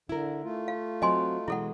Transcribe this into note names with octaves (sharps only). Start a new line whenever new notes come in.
D3 E4 A#4
A3 F4
F5
F#3 C4 D#5 G#5 C6
B2 E3 G#3 E4 A4 F#5